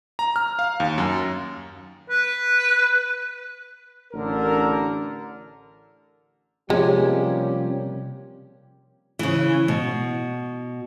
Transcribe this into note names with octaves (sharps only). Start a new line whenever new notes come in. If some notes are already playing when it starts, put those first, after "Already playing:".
A#5
F6
F5
D#2
F#2
B4
A1 D3 A#4
C3 F3 G3 G#3 A#3 C#4 G4
C#3 E3
B2